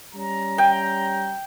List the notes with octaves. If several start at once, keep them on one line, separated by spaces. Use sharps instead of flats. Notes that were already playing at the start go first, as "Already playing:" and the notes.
G3 C#4 A#5
G5